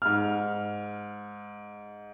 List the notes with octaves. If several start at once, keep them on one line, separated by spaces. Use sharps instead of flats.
G#2 F6